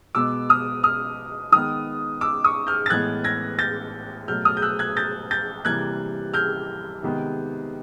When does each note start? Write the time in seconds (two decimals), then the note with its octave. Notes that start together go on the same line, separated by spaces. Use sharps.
0.15 B2 G#3 B3 D6 E6
0.49 D#6 F6
0.84 D#6 F6
1.52 D#3 G#3 B3 D#6 F6
2.21 D6 E6
2.44 C#6 D#6
2.67 F6 G6
2.86 A6
2.90 A2 E3 G#3 B3 F#6 G#6
3.24 G#6 A#6
3.59 G6 A6
4.28 B2 F#3 A3 F6 G6
4.45 D#6 F6
4.57 G6
4.62 E6 F#6
4.79 F#6 G#6
4.97 G6 A6
5.31 G6 A6
5.65 C3 E3 G3 A#3 F#6 G#6
6.34 F6 G6
7.03 C3 D#3 G#3 B3